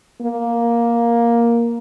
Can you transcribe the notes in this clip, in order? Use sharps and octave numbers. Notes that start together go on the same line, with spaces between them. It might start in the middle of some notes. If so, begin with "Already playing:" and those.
A#3